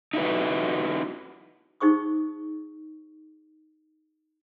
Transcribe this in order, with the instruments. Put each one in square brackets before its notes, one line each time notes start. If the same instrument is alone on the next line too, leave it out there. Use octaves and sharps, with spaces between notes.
[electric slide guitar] D#4 E4 F#4 B4
[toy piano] D#4 G#4 C5 C#6 D#6